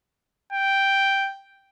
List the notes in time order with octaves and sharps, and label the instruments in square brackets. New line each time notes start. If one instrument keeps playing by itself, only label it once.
[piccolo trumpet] G5